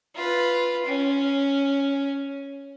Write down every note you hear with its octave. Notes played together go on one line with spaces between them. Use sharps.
F4 B4
C#4